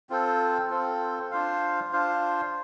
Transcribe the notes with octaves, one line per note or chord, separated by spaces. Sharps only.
C4 F4 A4 C5
C4 F4 A4 C5
D4 F4 C5 F5
D4 F4 C5 F5